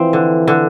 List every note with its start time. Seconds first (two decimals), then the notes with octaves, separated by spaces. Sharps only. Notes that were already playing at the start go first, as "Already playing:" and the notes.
Already playing: E3 F3 C4
0.13 D3
0.48 D3